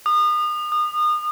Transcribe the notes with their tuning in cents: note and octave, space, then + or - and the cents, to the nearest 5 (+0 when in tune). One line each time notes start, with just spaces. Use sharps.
D#6 -35
D#6 -30